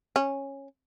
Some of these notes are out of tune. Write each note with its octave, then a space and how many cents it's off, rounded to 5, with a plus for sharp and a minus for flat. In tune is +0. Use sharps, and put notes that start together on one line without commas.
C#4 -10